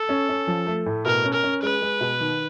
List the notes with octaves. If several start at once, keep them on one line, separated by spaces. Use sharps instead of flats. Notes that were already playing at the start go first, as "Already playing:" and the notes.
Already playing: A4
C#4
C#4
F3
A3
A2
B2 A#4
C#4
A#4
C#4
G#3 B4
G#3
B2
D#3